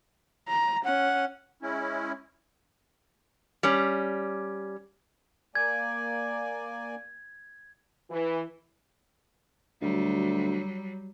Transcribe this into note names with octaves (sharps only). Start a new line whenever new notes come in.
A#5
C#4 F#5
G#3 C#4 E4
G3 C#4
A#3 D5 G#5 G#6
E3
D2 F#3 G3